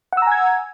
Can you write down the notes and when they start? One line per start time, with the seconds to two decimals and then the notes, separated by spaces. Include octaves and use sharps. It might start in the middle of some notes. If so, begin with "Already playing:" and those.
0.13 F#5
0.17 E6
0.22 A#5
0.27 G#5
0.32 G#6